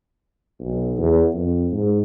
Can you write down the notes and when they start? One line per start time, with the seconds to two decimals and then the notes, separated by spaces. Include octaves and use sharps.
0.60 B1
0.99 E2
1.34 F2
1.72 G#2